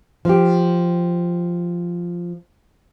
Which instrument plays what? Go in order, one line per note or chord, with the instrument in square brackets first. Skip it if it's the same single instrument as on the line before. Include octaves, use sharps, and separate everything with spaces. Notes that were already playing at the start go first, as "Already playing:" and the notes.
[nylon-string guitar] F3 G4